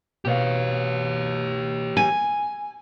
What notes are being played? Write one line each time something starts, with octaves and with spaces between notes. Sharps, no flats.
B2 G4 C#5 F5
G#5